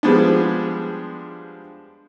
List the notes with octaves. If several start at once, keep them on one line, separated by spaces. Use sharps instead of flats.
F3 G3 G#3 B3 D4